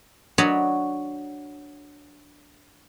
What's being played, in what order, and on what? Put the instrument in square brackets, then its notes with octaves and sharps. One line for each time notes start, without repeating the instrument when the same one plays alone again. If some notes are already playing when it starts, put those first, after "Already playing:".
[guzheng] F#3 D4 C#5 D#5 A5 B5